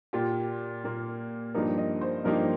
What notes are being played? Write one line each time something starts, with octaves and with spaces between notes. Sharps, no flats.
A#2 A#3 F4 G4
A#2 A#3 F4
G2 F3 A#3 D#4 G4 A#4
D#5
C5
G2 F3 A#3 D#4 G4 A#4